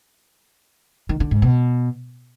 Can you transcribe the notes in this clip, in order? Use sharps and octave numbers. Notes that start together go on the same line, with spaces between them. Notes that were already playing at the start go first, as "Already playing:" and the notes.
D#3
D3
G#2
B2